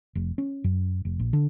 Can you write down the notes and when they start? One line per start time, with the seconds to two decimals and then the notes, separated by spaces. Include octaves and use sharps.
0.15 F1
0.38 C#4
0.64 F#2
1.05 F1
1.19 A#1
1.33 D3